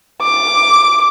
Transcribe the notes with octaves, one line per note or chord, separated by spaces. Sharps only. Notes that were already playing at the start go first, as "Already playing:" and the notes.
D6